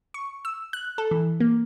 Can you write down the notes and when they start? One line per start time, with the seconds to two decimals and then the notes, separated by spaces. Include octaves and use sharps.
0.14 C#6
0.45 E6
0.73 F#6
0.98 A4
1.11 E3
1.40 A#3